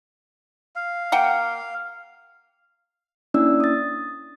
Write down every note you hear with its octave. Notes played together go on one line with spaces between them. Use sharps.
F5
A#3 F#5 G5
A#3 C#4 D4 E4 D5 E6
D#6 A6